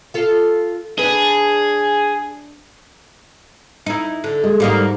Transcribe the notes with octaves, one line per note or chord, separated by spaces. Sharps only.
F4 A4
D4 G#4 B4
D#4 E4
D3
G#3
D2 G#2 G3 A#3 D#4